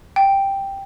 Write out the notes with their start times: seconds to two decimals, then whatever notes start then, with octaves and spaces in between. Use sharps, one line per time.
0.16 G5